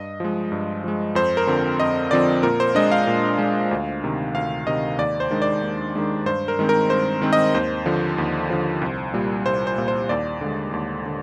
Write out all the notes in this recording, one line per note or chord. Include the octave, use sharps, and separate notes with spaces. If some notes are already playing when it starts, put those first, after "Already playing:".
Already playing: G2 D#5
F3 G#3
G2
F3 G#3
F2 C5
A#4
D3 F3 C4
F2 D#5
D3 F3 C4 D5
A#2 A#4
C5
G#3 D4 D#5
F5
A#2
G#3 D4
D2
C3 D#3
D2 F5
C3 D#3 D#5
D#2 D5
C5
D#3 G#3 D4
D5
D#2
D#3 G#3 D4
G2 C5
A#4
D#3 G#3 C4
A#4
G2 C5
D#3 G#3 C4
D#5
D#2 C5
D3 F3
D#2
D3 F3
C2
A#2 G3
C2 C5
C5
A#2 G3
C5
D#2 D5
D3 G#3
D#2
D3